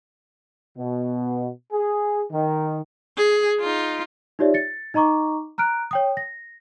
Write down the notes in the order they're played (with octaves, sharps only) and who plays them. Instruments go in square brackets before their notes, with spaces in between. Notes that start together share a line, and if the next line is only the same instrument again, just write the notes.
[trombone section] B2
G#4
D#3
[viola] G#4
D#4 F4
[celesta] D#4 F4 G4 C#5 D5 E5
A6 C#7
D#4 D#5 A#5 C#6 D6
A#5 F6 F#6 D7
C#5 G5 D#6
A#6